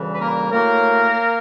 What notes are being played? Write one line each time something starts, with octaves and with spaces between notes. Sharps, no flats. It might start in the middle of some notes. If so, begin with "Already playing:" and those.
Already playing: D2 C#3 E3 G3
B4
A#3 A#4
A2 F#3 A3 A#3 A#4